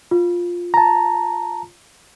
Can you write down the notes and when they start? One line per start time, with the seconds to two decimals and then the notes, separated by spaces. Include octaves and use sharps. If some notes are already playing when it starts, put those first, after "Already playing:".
0.11 F4
0.74 A5 A#5